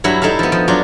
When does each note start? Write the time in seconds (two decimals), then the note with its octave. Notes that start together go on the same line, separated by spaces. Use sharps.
0.04 G2 F#3 E4 F#5 B5
0.22 D#4 E4 A4 E5 F5
0.39 F3 B3
0.52 F3
0.68 F#3 D4 F4